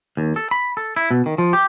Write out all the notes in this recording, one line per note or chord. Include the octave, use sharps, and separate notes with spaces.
D#2
A4
B5
A4
E4
B2
D#3
F3
G4